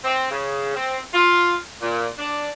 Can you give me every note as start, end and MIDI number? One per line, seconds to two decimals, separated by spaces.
0.05 0.29 60
0.31 0.74 49
0.76 0.99 60
1.14 1.56 65
1.82 2.08 46
2.19 2.50 62